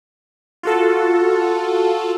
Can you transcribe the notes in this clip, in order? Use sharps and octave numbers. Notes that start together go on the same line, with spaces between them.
F4 F#4 A4